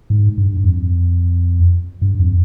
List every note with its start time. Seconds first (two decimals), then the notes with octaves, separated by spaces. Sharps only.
0.10 G#2
0.38 G2
0.64 F2
2.02 G2
2.19 F2